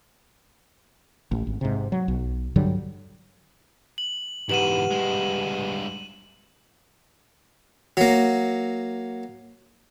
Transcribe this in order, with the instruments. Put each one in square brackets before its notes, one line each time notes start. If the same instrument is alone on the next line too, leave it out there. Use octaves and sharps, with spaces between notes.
[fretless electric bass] A1
G#1
G#2 C3
F#3
B1
G2 D3 F#3 G3
[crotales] F#7
[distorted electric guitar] E2 G#2 [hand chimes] G4 B4 F#5 [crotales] D#7 E7 F#7
[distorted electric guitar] G2 G#3
[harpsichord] F#3 A#3